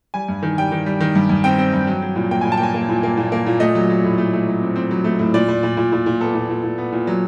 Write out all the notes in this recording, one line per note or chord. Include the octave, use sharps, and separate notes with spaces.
G3 G#5
G2
D#3
G3 G5
D#3
G3
D#3
G2
G2
C4 G5
C4
G2
F#3
F#3
A#2
A#3 G5
A#2 G#5
A5
G5
A#3 G#5
A#3
A#2
A#3
A#2
A#3
A#2
A3 D#5
F#3
F#3
A2
A3
A3
F#3
C4
C4
F#3
A3
A2
A#2 D5
A#2
A#2
A#2
A#2
A#2
B3 A4
A#2
A#2
A#2
B3
A#2
F#3